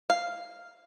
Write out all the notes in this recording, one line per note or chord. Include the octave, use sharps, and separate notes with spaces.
F5